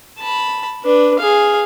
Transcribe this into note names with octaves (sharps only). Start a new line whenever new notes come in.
A5 B5
D4 B4
G#4 F5